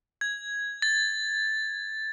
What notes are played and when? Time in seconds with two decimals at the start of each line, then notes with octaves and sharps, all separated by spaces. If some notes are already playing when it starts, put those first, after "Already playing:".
0.21 G#6
0.82 A6